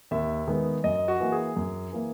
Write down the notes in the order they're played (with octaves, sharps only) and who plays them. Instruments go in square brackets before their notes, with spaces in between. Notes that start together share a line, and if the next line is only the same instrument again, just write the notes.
[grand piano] D#2 E5
D#3 G#3 B3
F#2 D#5
F#4
E3 A#3
G#4
F#2
E3 A#3